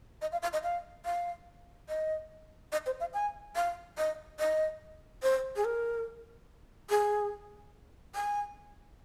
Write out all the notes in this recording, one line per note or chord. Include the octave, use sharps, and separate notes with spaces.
D#5
F5
F5
D#5
F5
F5
D#5
D#5
C5
F5
G#5
F5
D#5
D#5
C5
G#4
A#4
G#4
G#5